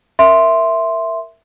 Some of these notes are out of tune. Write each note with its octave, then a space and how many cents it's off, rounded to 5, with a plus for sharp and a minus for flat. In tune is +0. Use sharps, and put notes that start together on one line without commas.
A#4 +0 E5 +0 C6 +0